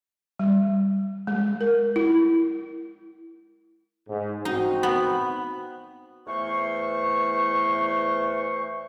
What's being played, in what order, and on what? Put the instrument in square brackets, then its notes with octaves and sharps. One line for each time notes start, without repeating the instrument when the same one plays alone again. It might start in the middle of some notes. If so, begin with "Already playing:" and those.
[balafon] G3
G#3
A#4
E4
[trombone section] G#2
[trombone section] C4 F#4 [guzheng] D#4
[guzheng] B3
[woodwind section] E2 E3 A3 C5 C#6